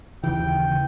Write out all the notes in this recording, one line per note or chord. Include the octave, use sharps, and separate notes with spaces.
D#2 C#3 E3 G5